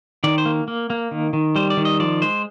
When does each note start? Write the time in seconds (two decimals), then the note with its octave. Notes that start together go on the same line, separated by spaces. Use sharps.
0.24 D#3 D5
0.38 C5
0.46 A#3
0.68 A#3
0.90 A#3
1.11 D#3
1.33 D#3
1.56 G3 C5
1.70 D5
1.77 D#3
1.85 D#5
2.00 F3 D5
2.22 G#3 C5